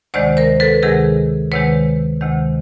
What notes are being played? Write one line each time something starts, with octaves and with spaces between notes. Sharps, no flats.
D2 C3 D#3 G#3 C5 D5
A#4 C5
A4 B4
D2 C3 D#3 G#3 G#4 A#4
D2 C3 D#3 G#3 B4 C#5
D2 C3 D#3 G#3